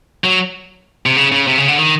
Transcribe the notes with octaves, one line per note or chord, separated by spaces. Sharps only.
F#3
C3
C#3
C#3
C3
C#3
D3
D#3